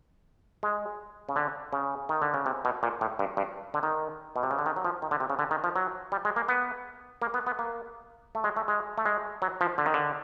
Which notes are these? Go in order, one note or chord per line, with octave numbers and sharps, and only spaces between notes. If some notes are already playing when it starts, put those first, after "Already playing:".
G#3
C#3
D3
C#3
D#3
D3
C#3
C3
B2
A#2
A2
G2
G2
D3
D#3
B2
C3
C#3
D3
D#3
F#3
F3
D#3
D3
C3
C#3
D3
D#3
F3
F#3
G3
G#3
A#3
B3
A#3
B3
B3
A#3
A3
G#3
A3
G#3
A3
G#3
F#3
F3
D3
D#3
D3